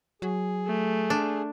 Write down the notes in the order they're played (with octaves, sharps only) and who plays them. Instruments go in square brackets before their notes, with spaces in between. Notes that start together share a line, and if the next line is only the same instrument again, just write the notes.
[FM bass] F#3 [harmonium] G#4
[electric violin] A3
[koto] D4